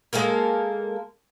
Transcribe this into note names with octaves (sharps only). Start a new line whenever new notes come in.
G#3 A#3 A4 A#4